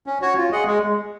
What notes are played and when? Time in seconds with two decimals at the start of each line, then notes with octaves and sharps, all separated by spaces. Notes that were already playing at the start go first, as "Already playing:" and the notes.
0.06 C#4
0.22 F#4 C#5
0.37 F4
0.52 G#4 D#5 F#5
0.67 G#3